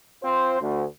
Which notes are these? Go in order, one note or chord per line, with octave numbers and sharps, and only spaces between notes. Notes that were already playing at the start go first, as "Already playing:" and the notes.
C4 F4 C5
D2